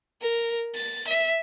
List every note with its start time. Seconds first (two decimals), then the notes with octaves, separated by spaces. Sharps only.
0.21 A#4
0.74 A6
1.07 E5